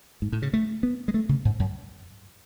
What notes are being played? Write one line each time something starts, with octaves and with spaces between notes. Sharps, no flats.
G#2
A2
C#3
A3
B3
G#3
A3
C#3
G#2
F#2